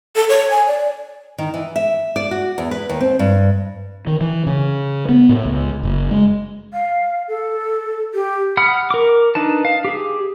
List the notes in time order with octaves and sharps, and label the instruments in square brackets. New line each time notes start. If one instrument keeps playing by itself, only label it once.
[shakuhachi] A4
C#5
G#5
D5
[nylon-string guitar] D#3
E3
E5
D5
F#4
E2
B4
D#2
C4
G2
[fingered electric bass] D#3
E3
C#3
B3
A2
C#2
F#1
G#3
[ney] F5
A4
G4
[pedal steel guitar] F#5 B5 D#6 F6
A#4 D6
D4 D#4 B4 A5
F5
G4 G#4